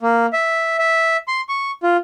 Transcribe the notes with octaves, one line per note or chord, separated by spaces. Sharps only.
A#3
E5
E5
C6
C#6
F4